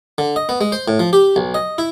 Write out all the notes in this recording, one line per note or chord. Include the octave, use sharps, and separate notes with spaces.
D3
D#5
B3
G#3
C5
A2
F3
G4
B1
D#5
E4